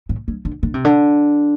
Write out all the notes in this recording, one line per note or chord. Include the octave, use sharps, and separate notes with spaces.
A2
G2
D3
D3
C3
D3